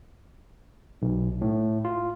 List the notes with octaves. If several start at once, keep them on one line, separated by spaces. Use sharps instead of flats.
B1
A2
F4